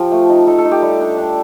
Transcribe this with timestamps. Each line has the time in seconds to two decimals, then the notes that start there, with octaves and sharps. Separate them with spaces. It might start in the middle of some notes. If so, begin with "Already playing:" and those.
Already playing: F3 F4 G4
0.12 A3
0.30 D#4
0.47 D#4 A4
0.58 A4
0.65 D#4
0.71 G4
0.82 G3
1.01 D4
1.18 D4